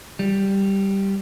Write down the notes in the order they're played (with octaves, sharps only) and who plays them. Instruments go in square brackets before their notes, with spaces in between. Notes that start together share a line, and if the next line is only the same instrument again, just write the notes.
[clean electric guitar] G3